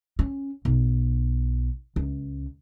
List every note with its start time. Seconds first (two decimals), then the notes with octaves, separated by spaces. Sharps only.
0.19 C#4
0.65 B1
1.96 C#2